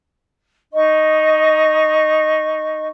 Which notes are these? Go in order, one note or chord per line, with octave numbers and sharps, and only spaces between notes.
D#4 D#5 C#6